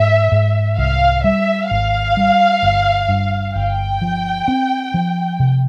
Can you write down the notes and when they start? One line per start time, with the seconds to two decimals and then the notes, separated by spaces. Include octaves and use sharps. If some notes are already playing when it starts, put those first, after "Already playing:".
Already playing: G#2 E5
0.32 G#2
0.78 C2 F5
1.24 G3 E5
1.71 G#1 F5
2.17 G3
2.63 G1
3.09 G2
3.55 G1 G5
4.02 F3
4.48 C4
4.94 F3
5.40 C3